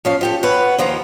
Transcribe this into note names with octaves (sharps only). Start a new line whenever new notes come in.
F3 C#4 F5
F3 G4 A4
B4 C#5 E5 F#5
D#2 F3 F4 A#5